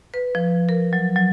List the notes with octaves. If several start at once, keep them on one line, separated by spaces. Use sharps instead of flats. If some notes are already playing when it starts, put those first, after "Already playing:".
B4
F3
A#4
F#3
F#3